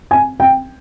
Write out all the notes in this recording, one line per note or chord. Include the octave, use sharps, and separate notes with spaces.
G#5
G5